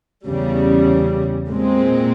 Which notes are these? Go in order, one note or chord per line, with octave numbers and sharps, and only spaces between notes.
E2 C#3 G3
A#2 G#3 C4